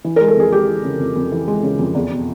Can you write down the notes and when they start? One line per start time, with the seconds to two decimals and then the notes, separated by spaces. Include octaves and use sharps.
0.04 E3
0.16 A#4
0.21 G#3
0.28 A4
0.36 F2 G#4
0.52 G#3 G4
0.68 E3
0.84 C#3
0.99 F2
1.16 F2
1.32 E3
1.48 G#3
1.63 C#3
1.79 F2
1.95 E2
2.12 B2